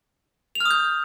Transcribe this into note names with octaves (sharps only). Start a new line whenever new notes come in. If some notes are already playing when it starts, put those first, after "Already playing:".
F7
F6
D#6
G6